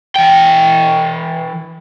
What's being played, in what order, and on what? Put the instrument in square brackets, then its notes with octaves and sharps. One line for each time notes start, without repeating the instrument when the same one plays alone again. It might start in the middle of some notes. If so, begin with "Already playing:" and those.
[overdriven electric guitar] E3 G5